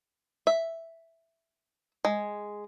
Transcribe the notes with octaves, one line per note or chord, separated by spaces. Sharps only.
E5
G#3